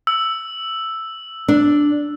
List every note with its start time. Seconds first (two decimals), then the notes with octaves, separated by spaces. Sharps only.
0.07 E6
1.48 D4